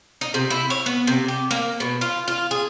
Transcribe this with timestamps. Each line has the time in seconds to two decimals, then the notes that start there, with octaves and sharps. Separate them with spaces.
0.21 D#4
0.34 C3
0.50 E4
0.70 C#5
0.86 B3
1.07 C3
1.28 G4
1.51 A#3
1.80 B2
2.01 F4
2.28 F4
2.51 G#4